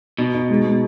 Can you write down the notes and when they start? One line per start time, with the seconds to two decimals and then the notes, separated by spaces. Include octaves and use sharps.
0.18 B2 D#4
0.34 D#4
0.50 G#3
0.65 G#3